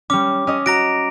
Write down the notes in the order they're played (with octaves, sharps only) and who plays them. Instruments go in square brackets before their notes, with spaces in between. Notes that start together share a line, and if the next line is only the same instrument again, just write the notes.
[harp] G3 C#4 [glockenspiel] D6
[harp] C#4 D#5
[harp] F#4 [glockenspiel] A#5 A#6 D7